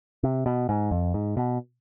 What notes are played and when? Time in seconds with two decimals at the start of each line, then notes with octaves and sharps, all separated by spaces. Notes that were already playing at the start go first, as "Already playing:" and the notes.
0.23 C3
0.46 B2
0.69 G#2
0.91 F2
1.14 G#2
1.37 B2